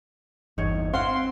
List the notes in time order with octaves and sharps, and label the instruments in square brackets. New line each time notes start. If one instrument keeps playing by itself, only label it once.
[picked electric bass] G1 E2 [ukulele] D#4 C#5
[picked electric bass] C4 [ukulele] F5 F#5 [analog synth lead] C6